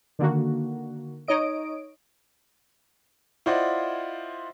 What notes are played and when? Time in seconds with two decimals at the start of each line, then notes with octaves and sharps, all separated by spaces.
0.19 D3 D#3 A#3 F#4
1.28 D#4 C#5 D#5 D7
3.46 E4 F4 C5 D5 D#5 F#5